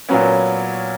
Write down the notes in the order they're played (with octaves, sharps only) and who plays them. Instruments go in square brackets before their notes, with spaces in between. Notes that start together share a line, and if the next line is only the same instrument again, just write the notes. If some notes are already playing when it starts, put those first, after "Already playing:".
[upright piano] A#2 F#3 B3 C#4